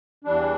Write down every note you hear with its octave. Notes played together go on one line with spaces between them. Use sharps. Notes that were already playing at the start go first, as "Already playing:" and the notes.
E2 E3 G3 D4